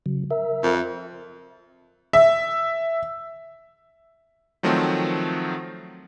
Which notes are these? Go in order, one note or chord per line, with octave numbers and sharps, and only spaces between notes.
C#3 F#3
A#4 E5
F2
E5
D#3 F3 F#3 A3 C4